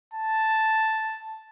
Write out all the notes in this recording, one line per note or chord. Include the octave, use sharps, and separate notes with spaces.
A5